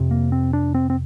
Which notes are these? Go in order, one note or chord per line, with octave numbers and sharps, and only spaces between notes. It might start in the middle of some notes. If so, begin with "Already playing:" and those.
Already playing: F2 C3
A#3
C4
D4
C4
C4